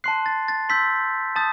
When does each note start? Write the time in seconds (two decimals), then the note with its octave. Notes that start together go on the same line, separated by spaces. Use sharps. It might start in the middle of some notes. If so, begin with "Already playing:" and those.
0.04 A5 C6 F#6 C7
0.26 A6
0.48 A6
0.69 C6 E6 G6 B6
1.36 A5 D#6 G6 A6